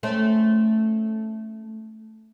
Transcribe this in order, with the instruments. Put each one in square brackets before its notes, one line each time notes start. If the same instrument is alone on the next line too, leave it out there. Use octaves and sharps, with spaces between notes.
[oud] A3 C4 C#4